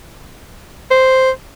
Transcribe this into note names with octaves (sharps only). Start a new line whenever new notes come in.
C5